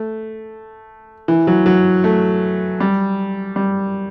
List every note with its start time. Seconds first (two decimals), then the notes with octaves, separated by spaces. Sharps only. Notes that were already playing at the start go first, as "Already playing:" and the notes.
Already playing: A3
1.28 E3
1.47 F#3
1.66 F#3
2.04 A3
2.80 G3
3.56 G3